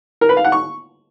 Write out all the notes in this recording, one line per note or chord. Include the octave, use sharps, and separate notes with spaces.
A#4
B4
F5
F#5
C#6